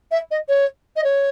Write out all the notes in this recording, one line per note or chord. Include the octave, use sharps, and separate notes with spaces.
E5
D#5
C#5
D#5
C#5